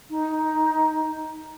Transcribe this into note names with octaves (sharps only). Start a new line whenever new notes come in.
D#4